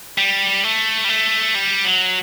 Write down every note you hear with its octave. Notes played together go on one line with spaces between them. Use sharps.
G3
A3
G3
A3
G3
F#3